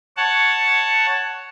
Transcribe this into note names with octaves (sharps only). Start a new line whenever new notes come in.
C#5 F#5 A5